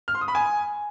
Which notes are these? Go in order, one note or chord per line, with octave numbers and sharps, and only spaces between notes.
F6
C6
D#6
B5
G#5